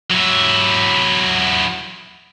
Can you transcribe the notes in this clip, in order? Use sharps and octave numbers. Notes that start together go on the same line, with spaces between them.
F#3 E4